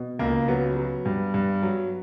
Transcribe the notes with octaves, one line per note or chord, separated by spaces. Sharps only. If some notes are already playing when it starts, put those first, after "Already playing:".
Already playing: B2
C#2 A#3
F#3 B3
F#3
G2
G2
F#3